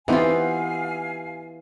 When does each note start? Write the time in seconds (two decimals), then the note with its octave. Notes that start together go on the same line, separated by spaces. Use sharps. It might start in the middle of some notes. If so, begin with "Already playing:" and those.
0.08 E3 B3 C4 D#4 F4 G4 F5 G#5